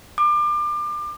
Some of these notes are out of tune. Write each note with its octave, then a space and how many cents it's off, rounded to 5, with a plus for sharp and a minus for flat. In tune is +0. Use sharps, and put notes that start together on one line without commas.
D6 +30